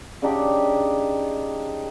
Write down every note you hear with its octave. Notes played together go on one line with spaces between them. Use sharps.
C#3 D4 D#4 G4